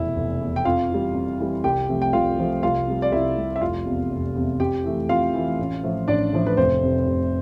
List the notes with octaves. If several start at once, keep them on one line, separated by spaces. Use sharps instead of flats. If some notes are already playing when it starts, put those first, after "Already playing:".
Already playing: F1 E2 B2 E4
F1
E2 B2
G5
F2 F4 F5
E3 G3
F2
E3 G3
C2 G4 G5
C3 F3 A3
G5
C2 F4 F5
C3 F3 A3
C2 F4 F5
C3 G3
D5
C2 E4 E5
C3 G3
E5
F1 F4 F5
E2 C3
F1
E2 C3
F2 G4 G5
E3 A3
F2 F4 F5
E3 A3
A1
A2 F3 A3
A1 D4 D5
A2 F3 A3
B4
F1 C4 C5
F2 C3
F1